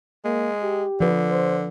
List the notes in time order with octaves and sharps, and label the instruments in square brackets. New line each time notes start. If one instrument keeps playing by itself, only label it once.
[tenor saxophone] G#3 [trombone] A#3
[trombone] G4
[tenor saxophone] D3 [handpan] F3 B4
[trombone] C5